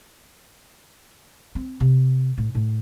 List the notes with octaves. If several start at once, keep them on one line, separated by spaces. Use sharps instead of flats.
C4
C3
A2
A2